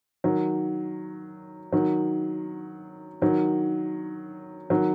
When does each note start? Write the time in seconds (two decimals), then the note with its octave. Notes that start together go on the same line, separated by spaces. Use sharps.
0.24 D#3 F#3
1.72 D#3 F#3
3.22 D#3 F#3
4.70 D#3 F#3